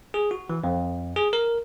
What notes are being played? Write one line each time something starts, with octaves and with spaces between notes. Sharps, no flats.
G#4
F#4
E3
F2
G#4
A#4